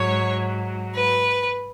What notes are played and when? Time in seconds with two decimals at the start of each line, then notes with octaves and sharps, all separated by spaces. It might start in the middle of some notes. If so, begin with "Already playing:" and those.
Already playing: G#2 F#3 C#5
0.94 B4